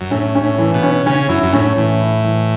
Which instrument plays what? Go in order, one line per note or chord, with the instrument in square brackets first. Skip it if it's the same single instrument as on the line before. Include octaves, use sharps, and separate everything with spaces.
[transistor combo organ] F#2
[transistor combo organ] A2 [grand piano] C#4
[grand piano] C#4
[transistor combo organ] A2
[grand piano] E3
[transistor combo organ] B2
[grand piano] C#4
[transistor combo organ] C#3 [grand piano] C#4
[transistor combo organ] F#2 [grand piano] E4
[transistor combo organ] F#2
[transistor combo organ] A2 [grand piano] C#4
[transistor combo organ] A2 [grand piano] E3
[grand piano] E4
E3